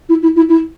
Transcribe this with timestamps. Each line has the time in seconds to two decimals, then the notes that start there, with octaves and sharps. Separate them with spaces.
0.09 E4
0.22 E4
0.36 E4
0.49 E4